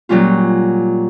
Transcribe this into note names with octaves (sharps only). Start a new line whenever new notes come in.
A#2 F#3 G3 C#4 F4